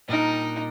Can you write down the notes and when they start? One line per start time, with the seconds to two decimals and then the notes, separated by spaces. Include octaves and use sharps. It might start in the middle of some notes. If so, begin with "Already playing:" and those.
0.09 A#2 G3 D4 D#4 G4 A#4